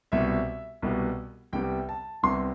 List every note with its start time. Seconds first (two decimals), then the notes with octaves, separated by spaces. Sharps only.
0.12 C2 B2 G3 B3 E5
0.82 C2 B2 G3 B3
1.53 C2 C3 G3 B3 G5
1.89 A5
2.23 C2 C3 G3 B3 C6